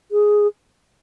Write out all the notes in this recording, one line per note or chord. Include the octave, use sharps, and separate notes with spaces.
G#4